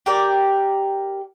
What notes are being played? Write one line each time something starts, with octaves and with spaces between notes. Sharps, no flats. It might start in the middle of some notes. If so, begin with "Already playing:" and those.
G4 A#4 D5 G5